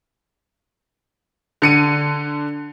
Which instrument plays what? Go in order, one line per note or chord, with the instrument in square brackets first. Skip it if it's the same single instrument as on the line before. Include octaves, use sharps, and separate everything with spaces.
[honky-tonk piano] D3 C#7 D#7